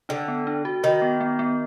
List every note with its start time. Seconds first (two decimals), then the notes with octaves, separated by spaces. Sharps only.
0.09 D3 D4
0.28 B3
0.47 D4
0.65 F#4
0.83 D#3 F#4
1.02 B3
1.21 B3
1.39 B3